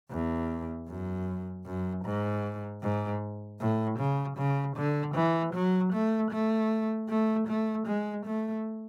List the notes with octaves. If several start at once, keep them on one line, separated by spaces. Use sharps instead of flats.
E2
F#2
F#2
G#2
G#2
A2
C#3
C#3
D3
E3
F#3
A3
A3
A3
A3
G#3
A3